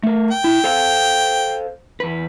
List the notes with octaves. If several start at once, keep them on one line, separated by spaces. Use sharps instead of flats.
A3 A#4
G5
E4
A4 C5 F5
E2 B4